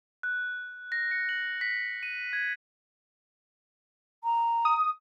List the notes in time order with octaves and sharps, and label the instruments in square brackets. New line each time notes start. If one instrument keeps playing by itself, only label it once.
[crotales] F#6
A#6
C#7
F#7
B6
D#7
G#6
[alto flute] A#5
[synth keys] D#6